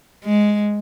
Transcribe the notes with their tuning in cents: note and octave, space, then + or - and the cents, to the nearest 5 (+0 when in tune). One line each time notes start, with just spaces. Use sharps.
G#3 +5